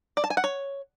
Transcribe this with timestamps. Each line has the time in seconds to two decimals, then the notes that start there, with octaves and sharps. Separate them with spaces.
0.17 D5
0.24 A5
0.30 G#5
0.37 F#5
0.44 C#5